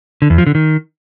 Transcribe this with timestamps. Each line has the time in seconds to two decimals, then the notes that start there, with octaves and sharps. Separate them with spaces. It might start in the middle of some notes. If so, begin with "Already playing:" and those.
0.22 D3
0.30 E2
0.38 F3
0.47 D3
0.55 D#3